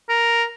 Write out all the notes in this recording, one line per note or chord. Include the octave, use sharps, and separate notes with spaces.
A#4